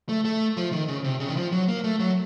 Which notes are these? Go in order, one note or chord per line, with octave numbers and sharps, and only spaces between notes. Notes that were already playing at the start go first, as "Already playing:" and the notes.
A3
A3
F3
D#3
C#3
C3
C#3
D#3
F3
F#3
A#3
A3
F#3